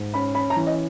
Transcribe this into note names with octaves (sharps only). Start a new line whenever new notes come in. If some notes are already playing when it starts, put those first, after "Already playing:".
Already playing: G#2
C#4 B5
C#4 B5
A#5
E3
D#5